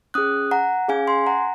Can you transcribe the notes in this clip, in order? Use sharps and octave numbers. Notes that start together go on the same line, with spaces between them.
C#4 G#4 D#6 F#6
F#5 A#5
C#4 G#4 F5 G#5
G#5 C6
F#5 A#5